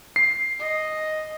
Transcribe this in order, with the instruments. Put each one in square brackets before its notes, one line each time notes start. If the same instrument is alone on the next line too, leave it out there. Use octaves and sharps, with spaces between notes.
[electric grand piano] C7
[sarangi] D#5